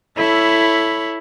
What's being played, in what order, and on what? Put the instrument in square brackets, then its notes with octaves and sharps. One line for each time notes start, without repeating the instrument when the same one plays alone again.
[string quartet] E4 A4 C#5 B5